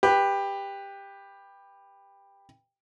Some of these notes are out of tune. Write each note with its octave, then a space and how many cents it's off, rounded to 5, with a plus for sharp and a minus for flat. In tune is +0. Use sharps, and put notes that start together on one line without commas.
G4 +15 B4 +0